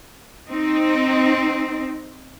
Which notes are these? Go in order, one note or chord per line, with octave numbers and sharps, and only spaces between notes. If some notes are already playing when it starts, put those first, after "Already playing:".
C4 D#4